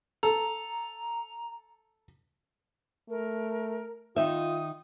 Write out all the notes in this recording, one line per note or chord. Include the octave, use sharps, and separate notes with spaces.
A4 A#5
A3 A#4
D#3 D#4 F4 E5 D#6